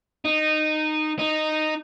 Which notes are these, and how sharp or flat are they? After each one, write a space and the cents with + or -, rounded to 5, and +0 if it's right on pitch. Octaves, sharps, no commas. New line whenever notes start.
D#4 -15
D#4 -10